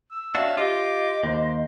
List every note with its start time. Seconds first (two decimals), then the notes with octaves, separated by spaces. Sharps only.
0.11 E6
0.35 D4 F#4 C#5 E5 F5
0.57 F4 G4 D#5 D6
1.23 D#2 C5